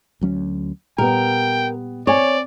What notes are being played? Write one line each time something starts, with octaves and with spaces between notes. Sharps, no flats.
D2 F#3 C#4
A#2 G3 B3 A#4 G5
C4 C#5 D5 G#5